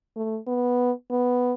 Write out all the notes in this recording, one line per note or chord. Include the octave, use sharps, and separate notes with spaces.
A3
B3
B3